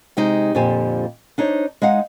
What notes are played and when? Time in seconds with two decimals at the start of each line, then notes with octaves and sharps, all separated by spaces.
0.17 C3 G#3 D#4 G4
0.55 F2 A#2 D3 G4 C5 G#5
1.38 D4 D#4 C5 C#5
1.82 G#3 D#4 F5 F#5